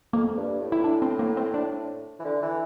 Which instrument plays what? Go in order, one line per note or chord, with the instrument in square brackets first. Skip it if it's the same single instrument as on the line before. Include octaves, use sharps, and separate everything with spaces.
[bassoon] F2 [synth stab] A#3
[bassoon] G2
A2
[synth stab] E4
D4
C4
A#3
C4
D4
[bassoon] E3
D3
E3